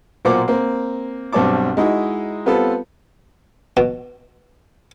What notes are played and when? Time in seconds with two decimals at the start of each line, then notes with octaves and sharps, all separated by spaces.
0.25 B1 A#2 A#3 C5 F#5 D6
0.48 A#3 C4
1.33 B1 G2 C4 C#5 A5 D6
1.77 G#3 D#4 E4 F#4
2.46 G3 B3 C4 F4 A4 B4
3.77 B2